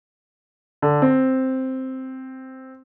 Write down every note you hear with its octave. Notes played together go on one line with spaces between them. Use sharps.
D3
C4